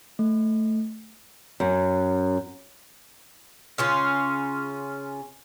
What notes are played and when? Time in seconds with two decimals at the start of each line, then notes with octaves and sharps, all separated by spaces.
0.19 A3
1.60 F#2
3.78 C#3 C#4 F4